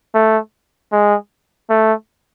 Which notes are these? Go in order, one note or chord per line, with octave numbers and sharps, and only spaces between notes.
A3
G#3
A3